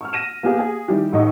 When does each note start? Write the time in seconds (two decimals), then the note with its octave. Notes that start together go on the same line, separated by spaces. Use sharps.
0.01 C#6 E6 F6
0.13 A#6 D#7 E7
0.43 A#3 B3 G4 G#4 F5
0.59 G#4
0.88 D#3 G3 E4 G4
1.12 A1 A2 D#4 D#5 C#6